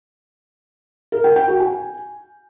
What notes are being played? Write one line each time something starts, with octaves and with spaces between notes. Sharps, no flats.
A#4
G5
G5
F#4
G#5